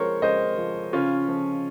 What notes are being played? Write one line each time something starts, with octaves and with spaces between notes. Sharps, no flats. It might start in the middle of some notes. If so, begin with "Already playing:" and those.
Already playing: F3 G#3 A#4 C5 C#5
G#3 C5 D#5
F3
C#3 C#4 F4
F3